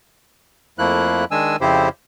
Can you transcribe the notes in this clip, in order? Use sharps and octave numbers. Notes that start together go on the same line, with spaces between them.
F2 F3 A3 A#3 E4 F#6
D#3 G#3 D4 G#5 E6
F2 C#3 C4 E4 G4 C5